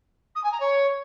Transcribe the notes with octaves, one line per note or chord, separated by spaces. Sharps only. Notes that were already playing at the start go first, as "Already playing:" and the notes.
D#6
G#5
A#5
C#5